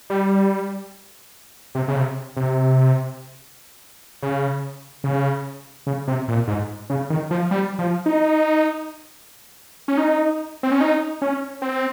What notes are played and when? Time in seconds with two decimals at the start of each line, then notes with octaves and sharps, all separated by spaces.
0.10 G3
1.75 C3
1.88 C#3
1.96 C3
2.37 C3
4.22 C#3
5.04 C#3
5.87 C#3
6.08 C3
6.28 A#2
6.48 G#2
6.90 C#3
7.10 D#3
7.31 F3
7.51 G3
7.79 F3
8.06 D#4
9.88 C#4
9.97 D#4
10.63 C4
10.71 C#4
10.81 D#4
11.22 C#4
11.62 C4